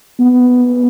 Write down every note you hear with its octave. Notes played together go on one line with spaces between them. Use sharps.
B3